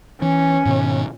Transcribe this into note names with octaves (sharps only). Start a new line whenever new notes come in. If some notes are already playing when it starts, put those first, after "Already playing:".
E3 C#4
G#2 B2 D#3